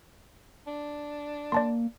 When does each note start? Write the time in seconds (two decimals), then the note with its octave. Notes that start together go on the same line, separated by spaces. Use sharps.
0.67 D4
1.52 A#3 D5 A5 C6